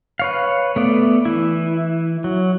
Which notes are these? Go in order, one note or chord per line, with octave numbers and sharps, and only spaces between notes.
B4 C#5 F5
A3 B3 D5
E3 E4
F#3